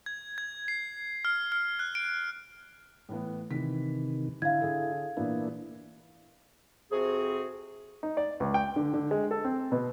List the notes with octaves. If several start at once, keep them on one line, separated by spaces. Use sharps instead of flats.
G#6
G#6
C7
F6
F6
F#6
D7
A2 E3 B3
C3 D#3 E3 B6
D3 E4 F5 G#6
D3 G#4 A4
A#2 E3 A#3 B3 D4 E4
F2 C3 C4 F#4 G#4
D#4
D5
C#2
G5
D3
D3
G#3
A4
C4
B2